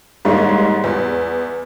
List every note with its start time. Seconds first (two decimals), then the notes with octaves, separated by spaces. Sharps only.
0.25 G#1 G#2 G3 A#3 D#4 C#5
0.84 E2